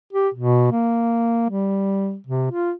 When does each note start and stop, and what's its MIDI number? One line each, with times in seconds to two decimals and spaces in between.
0.13 0.29 67
0.34 0.70 47
0.71 1.48 58
1.50 2.17 55
2.27 2.47 48
2.51 2.72 65